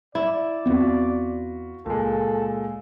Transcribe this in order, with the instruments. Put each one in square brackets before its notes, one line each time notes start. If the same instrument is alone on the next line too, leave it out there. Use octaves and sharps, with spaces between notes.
[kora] E4 [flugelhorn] D5
[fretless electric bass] E2 B3 C4 [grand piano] F4 F#4 B4
[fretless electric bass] C#2 [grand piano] A#2 G#3 [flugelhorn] A4